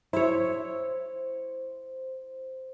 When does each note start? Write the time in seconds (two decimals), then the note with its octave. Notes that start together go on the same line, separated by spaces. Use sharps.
0.13 E4 C5 C#5